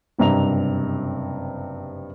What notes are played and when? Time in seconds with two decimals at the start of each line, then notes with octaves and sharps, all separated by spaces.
0.19 F#1 G2 C3 A#5 F7